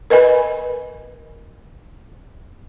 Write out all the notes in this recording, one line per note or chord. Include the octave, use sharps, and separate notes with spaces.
A#4 B4 D#5 G#5 B5